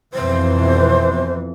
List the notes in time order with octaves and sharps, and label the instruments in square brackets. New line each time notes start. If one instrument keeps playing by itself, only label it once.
[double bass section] F2 B2 E3 [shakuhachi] C5